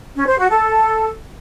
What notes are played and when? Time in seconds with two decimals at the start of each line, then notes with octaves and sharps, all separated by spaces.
0.16 C#4
0.27 C5
0.39 F#4
0.50 A4